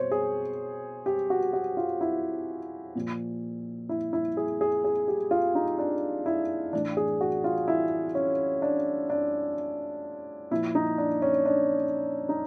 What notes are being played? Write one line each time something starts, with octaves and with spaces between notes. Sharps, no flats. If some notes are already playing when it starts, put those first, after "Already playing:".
Already playing: B2 C5 C#5
G#4
G4
F#4
F#4
F4
E4
A#2 F3
E4
E4
G#4
G#4
G#4
G4
F4
D#4
D4
E4
A2 E3 D4
G#4
F#4
F4
E4
C#4
D4
D4
A#2 F3 E4
D#4
D4
C#4
D4
D#4